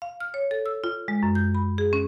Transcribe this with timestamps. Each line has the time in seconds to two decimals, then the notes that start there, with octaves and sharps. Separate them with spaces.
0.02 F5
0.20 F6
0.34 C#5
0.51 A4
0.66 E6
0.84 F4
1.08 G#3
1.23 F#2
1.35 G6
1.55 B5
1.78 G#4
1.93 C#4